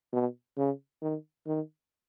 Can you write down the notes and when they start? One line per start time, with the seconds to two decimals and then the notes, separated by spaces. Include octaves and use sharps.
0.13 B2
0.57 C#3
1.02 D#3
1.47 D#3